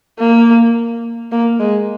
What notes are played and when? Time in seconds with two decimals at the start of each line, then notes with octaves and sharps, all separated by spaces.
0.19 A#3
1.32 A#3
1.60 G#3